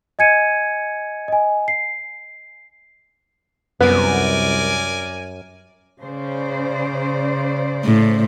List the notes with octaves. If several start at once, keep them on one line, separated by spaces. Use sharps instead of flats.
D#5 G#5 G#6 C#7 D#7
D#5 G#5
C7
C2 F#2 B3 A#4 D5 G#5
C#3 C5 D5
A2